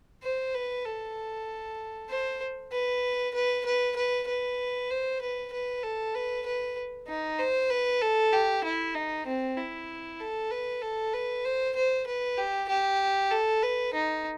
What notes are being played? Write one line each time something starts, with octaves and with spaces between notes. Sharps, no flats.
C5
B4
A4
C5
B4
B4
B4
B4
B4
C5
B4
B4
A4
B4
B4
D#4
C5
B4
A4
G4
E4
D#4
C4
E4
A4
B4
A4
B4
C5
C5
B4
G4
G4
A4
B4
D#4